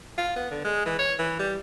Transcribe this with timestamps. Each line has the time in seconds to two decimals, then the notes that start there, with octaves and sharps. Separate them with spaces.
0.18 F4
0.36 B3
0.51 D3
0.65 G#3
0.86 E3
0.99 C#5
1.19 E3
1.39 G3